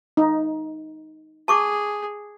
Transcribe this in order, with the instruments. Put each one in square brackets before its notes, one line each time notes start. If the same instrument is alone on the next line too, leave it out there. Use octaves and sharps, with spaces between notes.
[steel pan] D#4
[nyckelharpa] G#4 [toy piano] A5 C#6 D6